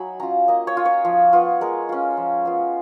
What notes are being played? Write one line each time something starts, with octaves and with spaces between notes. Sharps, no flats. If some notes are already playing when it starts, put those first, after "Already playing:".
Already playing: F#3 D#4 G#5 B5
C#4 F4 A#5
A#3 D#5
C#5
F4
C#5
F3
B3 F4
G#3 A#4
C#4 F4
F3
B3 F4